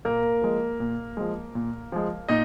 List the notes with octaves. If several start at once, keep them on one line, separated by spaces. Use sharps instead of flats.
A#2 A#3 A#4
F3 G#3
A#2
F3 G#3
A#2
F3 G#3
A#2 D#4 D#5